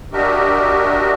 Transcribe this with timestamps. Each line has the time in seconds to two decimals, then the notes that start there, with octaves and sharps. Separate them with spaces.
0.13 D4 F#4 G4 A#4 D#5 E5